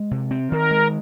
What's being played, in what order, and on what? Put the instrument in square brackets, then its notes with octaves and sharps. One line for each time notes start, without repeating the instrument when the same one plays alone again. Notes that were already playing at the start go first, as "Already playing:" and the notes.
Already playing: [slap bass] G#3
C3
C4
[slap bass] D#3 [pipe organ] A#4
[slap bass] G#3